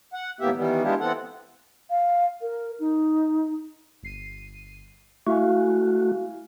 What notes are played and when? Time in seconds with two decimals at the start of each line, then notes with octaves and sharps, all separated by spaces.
0.13 F#5
0.40 D#2 A2 A#3 B3 G4 E5
0.56 D#3 E3 G3 B3
0.83 G#3 B3 D4 E4 F4 G4
1.00 E3 B3 C4 A4 F#5
1.90 F5
2.41 A#4
2.80 D#4
4.03 G1 C7 D#7
5.27 A3 E4 F#4 F5 G#5